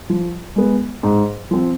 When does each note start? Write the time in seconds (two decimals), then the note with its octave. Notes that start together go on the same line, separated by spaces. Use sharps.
0.10 F3
0.56 G#3 B3
1.03 G#2
1.51 F3 C4